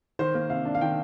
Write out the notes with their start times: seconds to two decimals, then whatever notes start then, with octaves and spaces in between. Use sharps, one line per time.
0.19 D#3 C5
0.34 A#3
0.50 C3 F5
0.65 D4
0.75 F5
0.81 D#3 G5